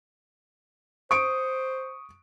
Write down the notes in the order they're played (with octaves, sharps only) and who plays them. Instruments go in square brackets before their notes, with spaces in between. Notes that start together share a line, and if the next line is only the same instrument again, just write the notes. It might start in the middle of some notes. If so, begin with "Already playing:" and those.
[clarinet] C5 [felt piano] C#6 D7 [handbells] D#6